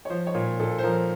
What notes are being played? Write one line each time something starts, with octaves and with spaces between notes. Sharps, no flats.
C#5
F3 C5
C#5
A#2
A#2 A4
C5
F3 A#4